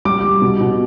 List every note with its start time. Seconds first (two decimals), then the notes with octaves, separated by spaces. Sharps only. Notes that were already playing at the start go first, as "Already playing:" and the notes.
0.05 G3 D6
0.24 G3
0.42 B2
0.61 B2